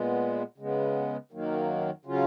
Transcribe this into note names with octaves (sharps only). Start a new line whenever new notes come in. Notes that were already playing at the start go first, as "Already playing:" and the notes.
Already playing: A#2 G#3 B3
C#3 G#3 B3
F#2 D#3 F#3 A#3
C#3 F#3 C#4 F4